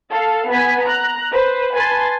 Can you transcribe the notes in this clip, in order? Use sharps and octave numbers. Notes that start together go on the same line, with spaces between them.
A4 F5
B3 G#5 B6
A#5 F#6
B4 C5
B4 G#5 A5 C6 A6